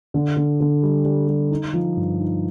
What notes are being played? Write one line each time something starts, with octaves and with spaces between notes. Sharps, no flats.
D3
D3
D3
G3
G3
G3
D#4
F3
G2
D#4